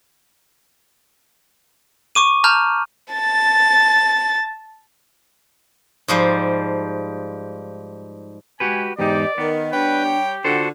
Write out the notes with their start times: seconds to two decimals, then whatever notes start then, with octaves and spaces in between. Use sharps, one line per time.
2.15 C#6 D6 D#7
2.44 A5 A#5 F6 G6
3.14 A5 A6
6.08 G#2 F3 G3
8.60 G#3 F#4 G4 B4 G#5
8.99 E2 G#2 D#4 G4 D5 D#5
9.38 D#3 B3 A#4
9.72 G3 D4 B4 C#5 G5
10.06 G4
10.44 D3 F4 F#4 A4 C5